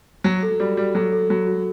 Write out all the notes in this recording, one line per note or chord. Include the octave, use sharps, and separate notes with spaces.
F#3 F#4
A4
G3 F#4
G3 F#4
F#3 A4
A4
F#3 F#4
F#4